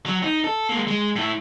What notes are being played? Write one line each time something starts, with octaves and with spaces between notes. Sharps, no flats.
F#3
D#4
A4
G#3 A#3
G#3
A2 E4